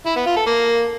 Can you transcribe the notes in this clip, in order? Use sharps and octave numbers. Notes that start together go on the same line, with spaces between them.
E4
B3
F4
A4
A#3